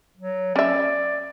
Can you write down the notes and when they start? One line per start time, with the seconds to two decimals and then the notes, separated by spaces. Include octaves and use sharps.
0.17 F#3
0.56 C#4 D5 E5